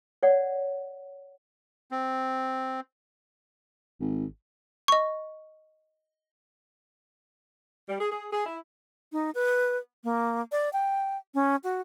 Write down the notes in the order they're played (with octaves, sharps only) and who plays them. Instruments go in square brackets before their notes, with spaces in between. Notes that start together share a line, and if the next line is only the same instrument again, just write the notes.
[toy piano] C#5 D5 F#5
[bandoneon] C4
[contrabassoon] G#1
[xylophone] D#5 C#6
[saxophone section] G3
G#4
G#4
G#4
E4
[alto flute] D#4
B4
A#3
D5
G5
C#4
F#4